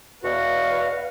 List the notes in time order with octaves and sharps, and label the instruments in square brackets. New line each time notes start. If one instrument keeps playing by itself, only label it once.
[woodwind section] E2 B2 [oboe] F#4 [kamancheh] B4 F5